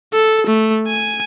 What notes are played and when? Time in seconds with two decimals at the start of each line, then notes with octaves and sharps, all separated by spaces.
0.13 A4
0.47 A3
0.87 G#5